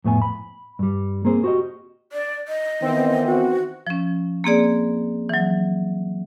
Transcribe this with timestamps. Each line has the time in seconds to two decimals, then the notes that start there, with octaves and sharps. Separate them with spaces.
0.05 F2 A2 B3 G#5
0.22 B5
0.79 G2 G3
1.25 A#3 C4 G#4 C5
1.44 F#4 G4 D#5
2.12 D5
2.48 D#5
2.82 D#3 E3 B3 C4
3.26 F#4
3.87 F3 C#4
4.44 A#3 C4 G#4 D5
5.29 E3 F#3